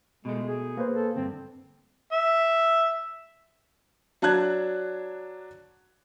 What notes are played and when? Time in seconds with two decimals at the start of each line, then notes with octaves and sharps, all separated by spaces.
0.25 B2 G#3 A3
0.48 G#4
0.77 A#3 B4 C5
0.96 A4
1.16 D2 G2 C4
2.12 E5
4.22 F#3 D4 A5 F#6 G#6